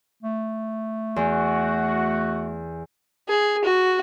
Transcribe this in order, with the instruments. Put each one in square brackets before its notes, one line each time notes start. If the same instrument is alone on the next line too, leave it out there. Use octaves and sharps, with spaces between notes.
[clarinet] A3
[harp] E2 [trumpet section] F#4
[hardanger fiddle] G#4
F#4